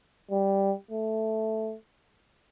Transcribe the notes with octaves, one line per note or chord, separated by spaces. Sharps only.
G3
A3